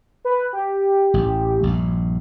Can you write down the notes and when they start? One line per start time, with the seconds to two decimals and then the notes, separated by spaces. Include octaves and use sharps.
0.25 B4
0.53 G4
1.14 A1
1.63 A#1 G2